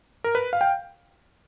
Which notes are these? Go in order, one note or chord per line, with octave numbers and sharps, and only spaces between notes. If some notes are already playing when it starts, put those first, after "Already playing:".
A#4
B4
F5
G5